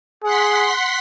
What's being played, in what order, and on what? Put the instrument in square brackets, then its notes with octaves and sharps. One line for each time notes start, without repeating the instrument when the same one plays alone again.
[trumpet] G#4 [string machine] F#5 C6 B6